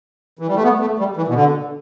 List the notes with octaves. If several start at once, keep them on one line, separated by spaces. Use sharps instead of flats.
E3
G3
A3
B3
A3
G3
E3
B2
D3